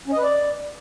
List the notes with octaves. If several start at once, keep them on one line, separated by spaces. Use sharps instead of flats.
C#4
D#5
B4
D5